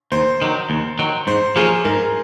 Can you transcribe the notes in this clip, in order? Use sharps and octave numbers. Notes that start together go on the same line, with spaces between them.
D#2 C5
D#3 F#3
D#2
D#3 F#3
G#2 C5
F3 A#3 C#4 F4 G#4
G#2 A#4